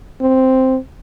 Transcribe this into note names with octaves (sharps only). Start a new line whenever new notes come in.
C4